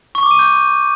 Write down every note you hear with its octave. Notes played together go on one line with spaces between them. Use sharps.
C#6
D6
D#7
G6